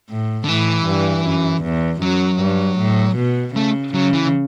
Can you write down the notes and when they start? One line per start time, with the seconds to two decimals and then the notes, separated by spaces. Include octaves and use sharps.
0.10 A2
0.44 D3
0.48 A2 E3
0.86 G2
1.26 F#2
1.64 E2
2.02 F#2 F#3
2.40 G2
2.79 A2
3.17 B2
3.55 C#3 A3
3.94 C#3 F#3
4.13 E3